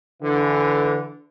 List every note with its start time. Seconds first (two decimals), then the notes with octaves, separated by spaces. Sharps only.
0.22 D3 E3